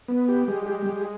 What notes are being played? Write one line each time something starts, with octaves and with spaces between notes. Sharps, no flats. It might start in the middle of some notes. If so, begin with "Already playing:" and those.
B3
G4
G#3
G4
G#3